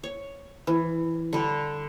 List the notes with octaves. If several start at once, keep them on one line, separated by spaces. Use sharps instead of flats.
C#5
E3
D3 G3